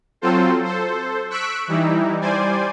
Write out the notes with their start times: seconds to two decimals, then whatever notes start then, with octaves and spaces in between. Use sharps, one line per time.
0.21 F#3 C4 F4 A4 C5
0.64 A4 C5
1.30 C#6 E6 F#6 B6 D7
1.68 E3 G3 D#4 E4
2.21 G3 C5 D5 G#5